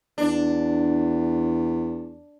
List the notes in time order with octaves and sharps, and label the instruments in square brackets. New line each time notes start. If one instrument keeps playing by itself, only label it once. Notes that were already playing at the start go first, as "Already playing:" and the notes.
[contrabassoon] E2 [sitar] D4